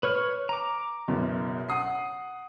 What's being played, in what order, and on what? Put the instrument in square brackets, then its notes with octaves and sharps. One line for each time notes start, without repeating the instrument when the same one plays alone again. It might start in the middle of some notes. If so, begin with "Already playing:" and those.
[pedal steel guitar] B4 C#5 F6
A#5 D6
[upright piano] F#1 F#2 B2
F#5 D#6 C7